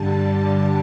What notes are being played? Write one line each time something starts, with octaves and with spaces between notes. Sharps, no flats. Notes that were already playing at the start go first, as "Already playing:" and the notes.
Already playing: G2 D3 G3 A5